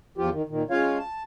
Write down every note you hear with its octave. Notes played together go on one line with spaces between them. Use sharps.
E2 F3 F4 G4
D#3
A#2 D#3
G#3 C#4 F4 C#5 F5
A5